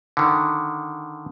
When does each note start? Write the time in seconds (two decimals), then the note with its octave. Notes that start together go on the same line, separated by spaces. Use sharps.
0.17 D3 D#3